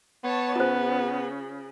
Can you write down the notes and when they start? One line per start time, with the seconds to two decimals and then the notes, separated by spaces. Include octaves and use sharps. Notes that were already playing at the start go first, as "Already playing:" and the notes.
0.24 B3 C#5 A5
0.56 C#3 F4 C5